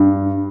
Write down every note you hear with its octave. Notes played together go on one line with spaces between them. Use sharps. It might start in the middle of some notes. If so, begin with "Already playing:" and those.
Already playing: G2